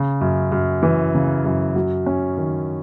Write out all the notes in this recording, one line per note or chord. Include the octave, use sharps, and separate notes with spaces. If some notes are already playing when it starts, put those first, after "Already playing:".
Already playing: C#3
F#2
F#2
E3
C#3
F#2
F#3
C#4
D#3